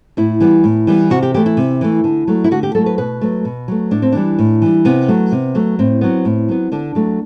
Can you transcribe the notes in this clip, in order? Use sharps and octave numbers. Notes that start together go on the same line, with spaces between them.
A2 E4
E3 G3 B3
A2
E3 G3 B3
C3 F#4
G4
E3 A3 G4
E4
C3
E3 A3
D3
F#3 A3
E4
D3 F#4
G4
F#3 A3 A4
B4
B2 B4
F#3 A3
B2
F#3 A3
A2 D4
C4
E3 G3 D4
A2
E3 G3
C3 B3
F#3 A3
C3
F#3 A3
A2 C4
F#3 B3
A2
F#3 B3
D3 D4
F#3 A3